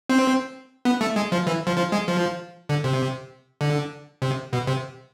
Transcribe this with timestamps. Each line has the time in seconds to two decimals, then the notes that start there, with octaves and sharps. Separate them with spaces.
0.09 C4
0.85 B3
1.01 A3
1.16 G#3
1.32 F3
1.47 E3
1.67 F3
1.77 F3
1.92 G#3
2.08 F3
2.69 D3
2.84 C3
3.61 D3
4.22 C3
4.53 B2
4.67 C3